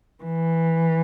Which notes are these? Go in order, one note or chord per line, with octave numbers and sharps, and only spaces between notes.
E3